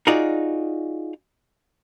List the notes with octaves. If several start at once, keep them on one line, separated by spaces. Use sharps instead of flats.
D#4 F4 F#4 G#4 D5